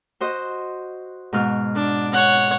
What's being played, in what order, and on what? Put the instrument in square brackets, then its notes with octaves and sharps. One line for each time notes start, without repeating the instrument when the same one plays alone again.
[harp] F#4 C5 D#5
G#2 B2 F6
[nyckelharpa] D4
C#5 F#5